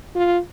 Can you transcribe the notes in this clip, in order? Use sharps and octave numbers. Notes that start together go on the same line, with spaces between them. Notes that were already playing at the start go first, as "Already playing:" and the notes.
F4